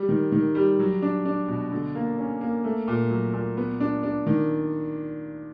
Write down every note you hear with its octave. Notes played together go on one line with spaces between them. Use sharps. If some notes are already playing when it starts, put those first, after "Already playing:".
Already playing: G3
D#3
D#3
G3
F#3
D4
D4
B2
D3
A#3
C#4
A#3
A3
A#2
F#3
A#2
B3
D4
D4
D#3